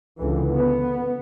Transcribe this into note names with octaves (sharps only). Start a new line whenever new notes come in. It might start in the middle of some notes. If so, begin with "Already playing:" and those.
C#2 D3 E3
B3